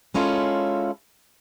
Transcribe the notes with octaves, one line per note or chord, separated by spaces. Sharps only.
G#3 C#4 E4 F4 A4